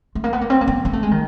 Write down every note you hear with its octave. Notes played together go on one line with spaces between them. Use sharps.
A3
A#3
B3
A#3
C4
A#3
B3
A#3
A3
G#3
D#3